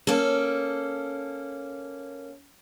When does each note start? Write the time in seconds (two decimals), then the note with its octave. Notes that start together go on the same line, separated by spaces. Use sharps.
0.07 A#3 C#4 A4